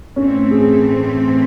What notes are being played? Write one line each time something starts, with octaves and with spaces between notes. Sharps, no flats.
A2 E3 A3 C4 C#4
G#4